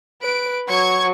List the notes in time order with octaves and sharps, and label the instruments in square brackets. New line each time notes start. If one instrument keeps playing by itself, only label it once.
[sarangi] B4 [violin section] D7
[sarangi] F#3 [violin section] C#6 G#6